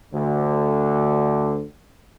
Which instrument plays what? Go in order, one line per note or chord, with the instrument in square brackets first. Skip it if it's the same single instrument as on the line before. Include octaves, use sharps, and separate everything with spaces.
[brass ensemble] D2 D3